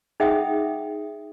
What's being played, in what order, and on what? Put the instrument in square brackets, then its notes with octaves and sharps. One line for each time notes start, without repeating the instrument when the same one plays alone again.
[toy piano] D#4 G#4 E5 F#5 G5 D#6